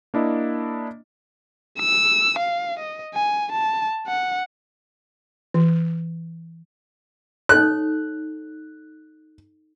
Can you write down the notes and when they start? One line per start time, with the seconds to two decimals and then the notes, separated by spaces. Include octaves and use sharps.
0.14 A#3 D4 E4 D#5
1.79 E6
2.39 F5
2.79 D#5
3.14 G#5
3.52 A5
4.07 F#5
5.54 E3
7.49 D#4 A4 C#5 F#6